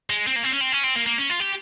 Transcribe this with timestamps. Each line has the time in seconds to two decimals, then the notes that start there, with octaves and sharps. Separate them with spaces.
0.10 G#3
0.27 C4
0.36 A#3
0.44 C4
0.52 C#4
0.61 C4
0.72 C#4
0.84 C4
0.96 A#3
1.06 A#3
1.18 C#4
1.30 F4
1.40 G4